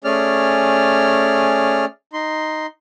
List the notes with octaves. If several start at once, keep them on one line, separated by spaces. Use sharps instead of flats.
A3 C#4 G#4 D5 F6
D#4 C6